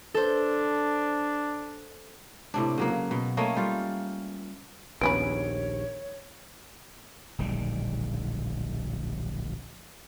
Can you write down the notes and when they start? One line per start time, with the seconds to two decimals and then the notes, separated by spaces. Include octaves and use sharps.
0.14 D4 A4 C5
2.54 A2 C3 D4
2.78 C#3 F#3 A#3
3.11 B2
3.37 A3 A#3 C#4 D#5
3.56 G3 F4
5.01 A#1 D#2 B3 C#4 B4 C#5 D7
7.38 D1 A#1 D#3 G3